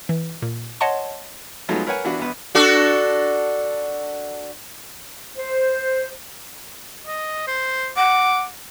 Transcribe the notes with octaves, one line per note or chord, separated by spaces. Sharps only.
E3
A#2
C#5 D#5 F#5 A5 C6
F3 F#3 G#3 A3 B3 D#4
A#4 B4 C#5 F#5 G#5
E3 B3 D4 F#4
A#1 B3
D4 F#4 A4
C5
D#5
C5
F#5 D6